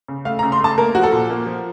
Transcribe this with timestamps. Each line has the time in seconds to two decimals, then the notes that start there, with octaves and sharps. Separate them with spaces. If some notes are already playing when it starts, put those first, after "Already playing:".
0.08 C#3
0.25 A3 F5
0.39 A#5
0.43 C#3
0.52 C6
0.60 A3 A5
0.78 A#3 A#4
0.95 F3 F#4
1.03 A4
1.12 A#2
1.30 A#3
1.46 F3